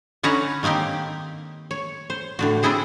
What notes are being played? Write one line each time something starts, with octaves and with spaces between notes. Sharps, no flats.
D3 C#4 D#4 B4 C#5 A#5
D#3 A#3 C4 D#4 G4
C#5
C5
A2 D3 F#4
C4 D4 E4 G#4 C5